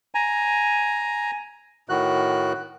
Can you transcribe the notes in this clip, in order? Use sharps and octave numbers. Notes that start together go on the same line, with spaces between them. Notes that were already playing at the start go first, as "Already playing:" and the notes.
G#5 A#5
A2 D#3 F#4 F#6